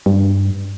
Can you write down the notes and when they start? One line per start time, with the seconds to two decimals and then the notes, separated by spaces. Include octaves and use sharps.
0.06 G2